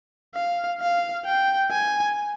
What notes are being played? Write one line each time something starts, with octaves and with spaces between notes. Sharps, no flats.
F5
F5
G5
G#5